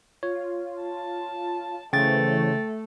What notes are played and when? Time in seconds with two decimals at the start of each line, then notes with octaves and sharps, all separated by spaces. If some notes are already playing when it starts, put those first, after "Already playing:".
0.23 F4 C#5
0.82 A5
1.93 C#3 E3 A3 C5 C#5 G5 A6